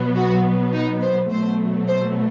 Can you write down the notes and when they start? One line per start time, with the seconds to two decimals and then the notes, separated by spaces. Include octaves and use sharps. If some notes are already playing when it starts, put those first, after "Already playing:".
Already playing: B2 F#3 B3
0.16 F#4
0.74 D#4
1.02 C5
1.31 B2 F#3 A3 C5
1.88 C5